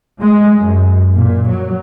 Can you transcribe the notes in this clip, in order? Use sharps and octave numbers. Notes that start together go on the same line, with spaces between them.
G#3
F#2
A#2
F#3